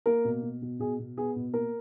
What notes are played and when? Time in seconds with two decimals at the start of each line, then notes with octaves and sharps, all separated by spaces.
0.06 A#3 A#4
0.25 B2
0.42 B2
0.62 B2
0.79 B2 G#4
0.99 B2
1.17 B3 G#4
1.36 B2
1.53 A#3 A#4